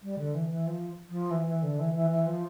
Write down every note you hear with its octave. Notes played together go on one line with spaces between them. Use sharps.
G3
D3
E3
E3
F3
F3
E3
E3
D3
E3
E3
E3
F3